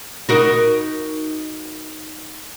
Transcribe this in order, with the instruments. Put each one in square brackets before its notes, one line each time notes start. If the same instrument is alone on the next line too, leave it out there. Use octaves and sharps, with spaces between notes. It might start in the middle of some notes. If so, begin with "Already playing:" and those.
[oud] D#4 F#4 A#4